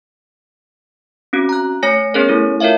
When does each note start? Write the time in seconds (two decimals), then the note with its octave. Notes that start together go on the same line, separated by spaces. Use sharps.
1.33 C4 C#4 F#4
1.49 A#5 F#6
1.83 A3 C#5 G#5 A#6 C#7
2.14 B3 C#4 G#4 A#4 C#5
2.29 A3 E4 A4
2.60 F4 A#4 C#5 E5 F5